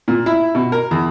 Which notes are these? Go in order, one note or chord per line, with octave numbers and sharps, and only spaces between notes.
A#2
E4
B2
A#4
E2